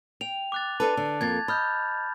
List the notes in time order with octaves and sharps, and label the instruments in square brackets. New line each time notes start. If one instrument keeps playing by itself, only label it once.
[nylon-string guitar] G5 [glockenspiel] F7
[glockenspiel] D6 F#6 A6
[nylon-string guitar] D4 A4 B4 [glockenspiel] A5
[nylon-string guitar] D3
[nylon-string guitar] F2 A#3 [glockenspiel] G#6 A6
[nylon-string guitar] D#5 [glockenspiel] B5 F6 G6